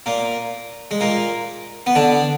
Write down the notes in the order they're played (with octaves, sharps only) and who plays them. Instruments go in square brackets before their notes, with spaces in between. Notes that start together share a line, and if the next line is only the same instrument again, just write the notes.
[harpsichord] A#2 A#3
G#3
A#2 A#3
B3
D3 D4